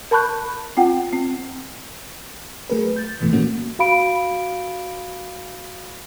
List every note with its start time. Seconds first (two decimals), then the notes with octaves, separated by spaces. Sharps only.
0.11 A#4 A5 B5 C#6 F#6 G6
0.77 C4 F4 F#5 G5
1.13 C4
2.70 F#3 A3 G#4 A#4 B4
2.96 G6 A6
3.20 A#1 E2 G#2 B2 E3 A3
3.32 A#2 D#3 A#3 C#4 F#4
3.79 F#4 F5 B5 D7